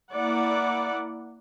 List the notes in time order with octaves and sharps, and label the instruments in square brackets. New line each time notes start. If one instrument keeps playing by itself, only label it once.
[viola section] A#3 E4 D5 F#5